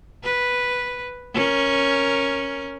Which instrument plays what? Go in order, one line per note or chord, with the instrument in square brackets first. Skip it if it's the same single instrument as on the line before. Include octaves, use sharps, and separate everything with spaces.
[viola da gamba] B4
C#4 A#4